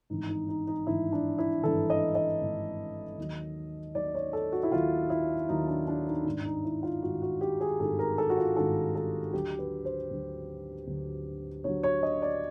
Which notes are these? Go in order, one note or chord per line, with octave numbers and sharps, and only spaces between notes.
G#1 G2 E3 D#4
D#4
D#4
D#4
G#1 G2 E3 E4
D4
E4
G#1 G2 E3 A4
D#5
D#5
G#1 G2 E3
D#2 D#3 F#3
D#2 D#3 F#3 D5
C#5
A4
F#4
E4
D#2 D#3 F#3 F4
E4
D#2 D#3 F#3 D#4
D4
D4
D#4
G#1 G2 D#3 D4
D#4
E4
F4
G#1 G2 D#3 F#4
F#4
G4
G#4
G#1 G2 D#3 A4
A#4
A4
F#4
F4
G#1 G2 D#3 A4
A4
D2 D3 F#3 G4
B4
C5
D2 D3 F#3
D2 D3 F#3
D2 D3 F#3 C#5
C#5
D#5
D5